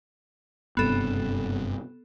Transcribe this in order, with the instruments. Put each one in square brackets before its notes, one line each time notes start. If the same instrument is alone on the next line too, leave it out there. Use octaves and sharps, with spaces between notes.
[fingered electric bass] F#1 G2 C3 [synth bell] B3 A4